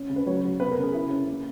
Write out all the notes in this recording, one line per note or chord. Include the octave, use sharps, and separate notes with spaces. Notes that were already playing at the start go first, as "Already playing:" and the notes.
Already playing: C#4
C#3
B4
F#3 C#5
F#3
B3 B4
A#4
C#3
G#4
E4
C#4
A#3